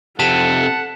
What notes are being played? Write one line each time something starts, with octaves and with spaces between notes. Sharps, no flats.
F2 C3 A4 F#5 A5 B6 E7